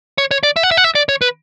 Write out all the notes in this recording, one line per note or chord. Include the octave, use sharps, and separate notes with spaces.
C#5
C#5
D5
E5
F#5
E5
F#5
E5
D5
C#5
B4